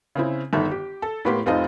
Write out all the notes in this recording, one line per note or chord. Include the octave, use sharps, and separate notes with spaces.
C#3 C4 E4
G1 D#3 A4 E5
G4
A4
A2 A#3 B3 G4 C6
F1 C4 D#4 F4 A4 D#5